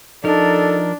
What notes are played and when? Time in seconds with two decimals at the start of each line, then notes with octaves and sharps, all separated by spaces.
0.24 F3 D4 D#4 A4 A#4